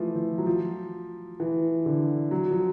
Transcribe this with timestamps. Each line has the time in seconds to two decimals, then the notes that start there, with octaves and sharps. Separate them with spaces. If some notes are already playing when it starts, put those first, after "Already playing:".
Already playing: E3 F3 A3
0.15 F3
0.38 F#3
0.46 F3
1.40 E3
1.86 D3
2.31 F#3
2.51 F3